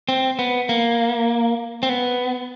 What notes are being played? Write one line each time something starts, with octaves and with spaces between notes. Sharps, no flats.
C4
B3
A#3
C4
B3